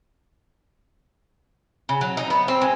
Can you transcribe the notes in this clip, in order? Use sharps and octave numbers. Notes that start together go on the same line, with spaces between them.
C#3
F#3
D#4
B3
C4
G#3